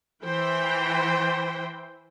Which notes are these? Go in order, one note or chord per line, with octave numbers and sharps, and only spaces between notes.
E3 C5 G5